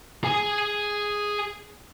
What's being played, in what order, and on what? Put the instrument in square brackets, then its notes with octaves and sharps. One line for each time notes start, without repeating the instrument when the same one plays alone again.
[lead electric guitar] G#4 G#5